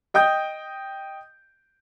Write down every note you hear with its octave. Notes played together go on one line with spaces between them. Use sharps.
D#5 G5 D#6 G6